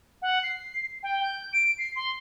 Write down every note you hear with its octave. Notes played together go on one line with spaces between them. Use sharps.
F#5
C7
G5
G6
D7
C7
C6